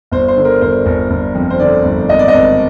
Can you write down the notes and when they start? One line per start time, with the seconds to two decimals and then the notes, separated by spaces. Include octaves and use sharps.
0.12 G1 C5
0.28 C5
0.36 D3
0.45 A#4
0.62 G1 C5
0.86 G1
1.10 G1
1.35 F2
1.50 C5
1.60 D3 D5
1.84 G1
2.09 G#1 D#5
2.19 D5
2.28 D#5
2.34 G#1